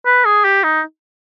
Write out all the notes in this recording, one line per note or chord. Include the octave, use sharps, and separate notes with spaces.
B4
G#4
G4
D#4